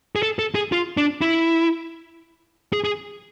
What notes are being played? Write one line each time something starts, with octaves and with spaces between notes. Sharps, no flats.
G#4
A4
A4
G#4
F4
D4
E4
G#4
G#4